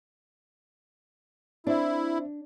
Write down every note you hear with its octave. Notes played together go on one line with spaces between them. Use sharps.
C4 D4 E4 C5 E5